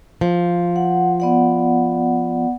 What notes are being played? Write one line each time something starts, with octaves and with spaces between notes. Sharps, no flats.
F3
F#5
B3 D5 F#5